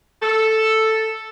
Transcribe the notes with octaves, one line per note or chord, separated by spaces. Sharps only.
A4